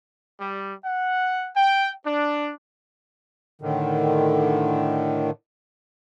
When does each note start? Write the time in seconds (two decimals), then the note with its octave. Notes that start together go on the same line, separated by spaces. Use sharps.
0.40 G3
0.84 F#5
1.55 G5
2.05 D4
3.62 A2 D3 D#3